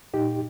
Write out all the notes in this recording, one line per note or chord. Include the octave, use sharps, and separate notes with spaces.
A#2 D#4 G4